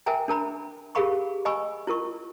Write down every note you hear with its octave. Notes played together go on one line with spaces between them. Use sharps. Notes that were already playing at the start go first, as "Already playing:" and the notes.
A#4 E5 G5 G#5 A#5
D4 A#4 A#5 B5
G4 G#4 A#4 F5 B5 C#6
D#5 G#5 B5 C#6 E6
E4 F4 A#4 C#6